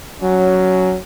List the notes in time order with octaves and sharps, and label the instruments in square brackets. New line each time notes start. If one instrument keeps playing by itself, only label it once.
[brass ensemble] F#3 C#4